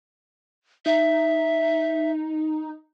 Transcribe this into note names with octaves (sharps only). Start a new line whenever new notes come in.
D#4 E5